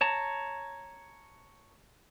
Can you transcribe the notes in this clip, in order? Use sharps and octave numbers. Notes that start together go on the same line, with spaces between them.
C#5 A5 A#5